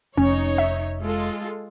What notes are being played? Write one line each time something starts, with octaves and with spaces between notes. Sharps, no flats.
F1 C#4 D#4 C#5
E5
G#3 F4 A4